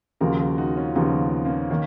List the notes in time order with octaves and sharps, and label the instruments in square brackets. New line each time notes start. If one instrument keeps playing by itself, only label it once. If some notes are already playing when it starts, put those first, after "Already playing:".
[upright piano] D#2 C#3 F3 [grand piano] F#4 A#4
[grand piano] F#4 A#4
D#4 F#4
C#4 F4
[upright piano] D#2 C#3 F3 [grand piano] B3 D#4
[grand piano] A#3 C#4
[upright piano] D#3 [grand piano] A#3 C#4